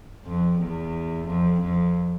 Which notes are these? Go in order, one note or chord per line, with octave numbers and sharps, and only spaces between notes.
F2
E2
F2
F2